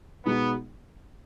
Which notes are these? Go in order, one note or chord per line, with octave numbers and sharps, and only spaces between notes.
B2 G#3 B3 D#4